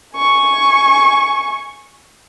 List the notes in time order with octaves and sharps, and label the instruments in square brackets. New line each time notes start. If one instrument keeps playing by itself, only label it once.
[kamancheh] G#5 C#6